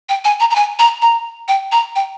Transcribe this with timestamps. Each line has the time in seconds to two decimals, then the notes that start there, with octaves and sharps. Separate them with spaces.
0.09 G5
0.25 G#5
0.40 A#5
0.50 A#5
0.56 G#5
0.79 A#5
1.02 A#5
1.48 G5
1.72 A#5
1.95 G5